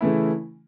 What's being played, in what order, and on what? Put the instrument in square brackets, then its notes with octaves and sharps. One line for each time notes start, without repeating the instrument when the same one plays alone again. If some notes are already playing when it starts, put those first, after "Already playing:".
[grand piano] C#3 E3 A3 E4